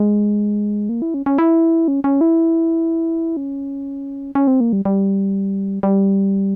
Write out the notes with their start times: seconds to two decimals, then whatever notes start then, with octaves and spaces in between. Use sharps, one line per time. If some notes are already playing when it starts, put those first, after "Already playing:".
Already playing: G#3
0.89 A#3
1.02 E4
1.14 C#4
1.26 C#4
1.38 E4
1.88 C#4
2.04 C#4
2.21 E4
3.37 C#4
4.35 C#4
4.47 C4
4.60 A#3
4.73 G3
4.85 G3
5.83 G3